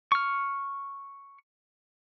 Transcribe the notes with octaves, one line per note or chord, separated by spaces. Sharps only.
C#6 F6